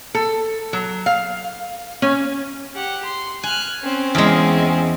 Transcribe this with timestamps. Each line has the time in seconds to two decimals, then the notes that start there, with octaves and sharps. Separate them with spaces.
0.15 A4
0.73 F#3
1.06 F5
2.02 C#4
2.75 G4 F#5
3.05 C6
3.43 G#5 F6 F#6
3.83 C4 C#4
4.15 E2 G#3